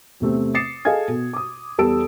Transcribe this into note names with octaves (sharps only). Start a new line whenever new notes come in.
E2 C3 A3 C4
D6 D#6 A6 C7 C#7 E7
G#4 A4 D#5 F5 G#5 G#6
B2
D6 D#6
E2 G3 A4 A5 E6 D7